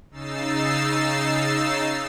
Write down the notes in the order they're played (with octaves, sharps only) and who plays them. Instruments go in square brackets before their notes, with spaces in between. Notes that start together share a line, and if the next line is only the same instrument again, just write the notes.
[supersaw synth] C#3 D#4 E6 A6 C7